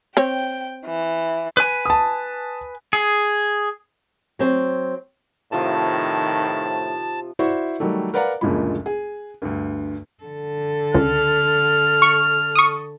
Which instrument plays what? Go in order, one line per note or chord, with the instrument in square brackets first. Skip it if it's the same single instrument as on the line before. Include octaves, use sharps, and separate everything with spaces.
[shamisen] C4 C#5 [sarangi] G5
[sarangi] E3
[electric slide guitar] B4 G#5
[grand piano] A5 D#6
[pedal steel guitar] G#4
[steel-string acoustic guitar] F#3 C4
[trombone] A2 [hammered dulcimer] C3 F3 [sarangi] D#3 [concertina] A5
[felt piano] E4 F#4 C5 D5 E5 C#6
D#3 F#3 G3 A3
A#4 B4 D5 F5 F#5 A#5
F#1 D2 A#2 F3 G#3 B5
G#4
D2 G2
[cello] D3 A4
[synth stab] C#2 [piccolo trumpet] F6
[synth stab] C#6
C#6 D#6